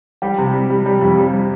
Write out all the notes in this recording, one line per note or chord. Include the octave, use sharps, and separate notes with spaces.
G3 G4
C3
G3
G3
G3
F2
G3